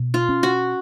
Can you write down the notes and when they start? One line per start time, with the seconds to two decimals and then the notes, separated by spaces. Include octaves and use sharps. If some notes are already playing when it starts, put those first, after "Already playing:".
Already playing: B2
0.14 F4
0.29 C#4
0.43 F#4